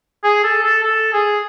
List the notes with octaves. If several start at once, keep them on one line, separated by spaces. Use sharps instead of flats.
G#4
A4
A4
A4
G#4